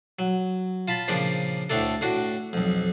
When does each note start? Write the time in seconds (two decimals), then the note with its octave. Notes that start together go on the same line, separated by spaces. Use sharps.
0.19 F#3
0.88 F4 A5 B5
1.08 A#2 C#3 F3 D4
1.70 D2 A2 A3 D4 A4
2.01 A2 D4 F#4
2.53 B1 F2